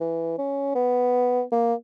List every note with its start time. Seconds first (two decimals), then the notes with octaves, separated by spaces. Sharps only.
0.01 E3
0.38 C#4
0.75 B3
1.52 A#3